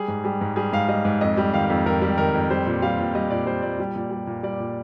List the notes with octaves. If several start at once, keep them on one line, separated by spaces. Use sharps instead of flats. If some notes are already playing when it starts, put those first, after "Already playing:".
Already playing: G3 G#4
G#2
G3 G#4
G#2
G3 G#4
G#2 F5
G3 D#5
G#2
F2 D#5
G3
D#3 F5
F2
F2 A#4
G3
D#3 A#4
F2
G3 C5
A#2
G3 F5
A#2
G3 D#5
A#2 D5
G3 C5
A#2 D5
G3
A#2
G3
A#2
G3 D5
A#2